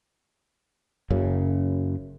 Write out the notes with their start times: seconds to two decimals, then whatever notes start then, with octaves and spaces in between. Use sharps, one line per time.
1.10 F#1 F#2 C#3